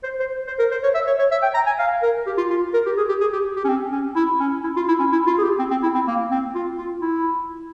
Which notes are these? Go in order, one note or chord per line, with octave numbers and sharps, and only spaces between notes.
C5
C5
C5
A#4
C5
C#5
E5
C#5
C#5
E5
G5
A#5
G#5
F5
A#4
G4
F4
F4
A#4
G4
G#4
G4
G#4
G4
G4
C#4
C4
C#4
E4
C#4
E4
F4
E4
C#4
E4
F4
G#4
G4
C4
C4
E4
C4
A#3
C4
F4
F4
E4